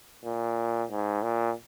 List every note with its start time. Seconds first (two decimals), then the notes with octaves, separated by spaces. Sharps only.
0.24 A#2
0.90 G#2
1.23 A#2